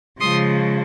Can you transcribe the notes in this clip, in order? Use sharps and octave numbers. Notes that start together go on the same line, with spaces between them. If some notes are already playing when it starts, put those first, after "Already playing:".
C#3 F3 G#3 C6 D#6